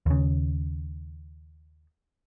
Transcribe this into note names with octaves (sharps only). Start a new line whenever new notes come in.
D#2 C#3